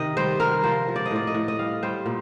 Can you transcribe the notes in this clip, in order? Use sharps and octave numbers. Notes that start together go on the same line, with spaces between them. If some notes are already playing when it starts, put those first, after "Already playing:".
Already playing: C3 D#3 D#5
G3 C5
C3 A#4
F3 C5
F3
D5
D#5
A2 D5
D#5
A2
D#5
G3 F5
G3 C5
A#2